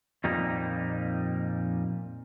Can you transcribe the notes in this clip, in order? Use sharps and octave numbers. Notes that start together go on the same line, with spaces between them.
F2 A#2 G3 A#3 D#4